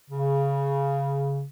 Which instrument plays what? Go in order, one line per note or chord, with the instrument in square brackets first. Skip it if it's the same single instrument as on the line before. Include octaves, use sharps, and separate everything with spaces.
[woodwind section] C#3